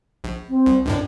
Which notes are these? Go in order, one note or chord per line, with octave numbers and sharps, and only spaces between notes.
A#1
C4
C2
C#2 F#2 A2 D4